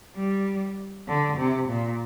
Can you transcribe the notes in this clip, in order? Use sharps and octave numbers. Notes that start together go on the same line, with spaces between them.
G3
D3
C3
A#2